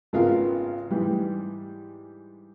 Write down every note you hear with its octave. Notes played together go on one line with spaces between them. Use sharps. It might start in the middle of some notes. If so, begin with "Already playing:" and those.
G#1 C#3 B3 F4 A#4 F5
G#2 E3 G3